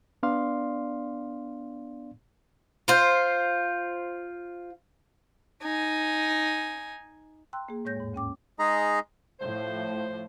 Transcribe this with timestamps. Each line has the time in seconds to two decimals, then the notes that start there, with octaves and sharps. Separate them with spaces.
0.23 B3 D4 D5 F5 C6
2.88 F4 C5
5.63 D#4 G#5
7.53 G5 A#5 C6 E6 F#6
7.69 A#3 G#4
7.85 A2 G#3 C#5 G6 A#6
7.96 E2 G#2
8.13 D2 C#4 G5 D6
8.59 G#3 D#4 G#4 D#5 A#5
9.40 A2 F3 C5